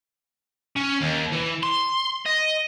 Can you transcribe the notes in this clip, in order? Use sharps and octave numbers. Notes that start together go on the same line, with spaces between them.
C#4
D#2
E3
C6
D#5